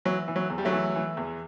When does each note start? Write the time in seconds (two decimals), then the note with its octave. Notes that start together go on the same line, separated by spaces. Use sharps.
0.05 E3 F#3
0.28 E3
0.36 F#3
0.50 E2
0.58 G3
0.65 F#3 A3
0.72 E3
0.95 E3
1.17 E2